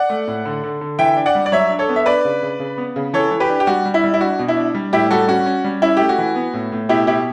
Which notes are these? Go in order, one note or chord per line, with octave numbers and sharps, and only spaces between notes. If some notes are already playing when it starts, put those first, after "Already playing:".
Already playing: D5 F#5
A3
A2
D3
D3
D3
E3 E5 G5
D4
D5 F#5
G3
D5
F#3 C#5 E5
D4
A4 C#5
B3
E5
D4 B4 D5
C#3
C#3
C#3
B3
C#3
E3 A4 C#5
E3
G4 B4
D4
G4
G3 F#4
G3
E4
G3
E4
D4 F#4
B2
E4
D4
G3
A2 E4 G4
G3 F#4 A4
C#4 F#4
C#4
G3
C#4 E4
A3 G4
F#4
E3
B3
A2
A2
B2 E4 G4
B2 E4 G4